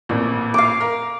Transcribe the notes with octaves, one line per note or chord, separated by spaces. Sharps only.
A1 F2 A#2
F5 D6
A#4